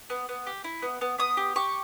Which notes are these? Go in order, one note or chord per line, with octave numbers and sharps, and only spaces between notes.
B3
B3
G4
E4
B3
B3
B3 D#6
G4
G4 C#6